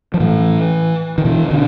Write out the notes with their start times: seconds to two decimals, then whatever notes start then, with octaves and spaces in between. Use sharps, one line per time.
0.14 F3
0.20 A2 E3
1.18 D#3
1.25 B2 E3
1.51 D3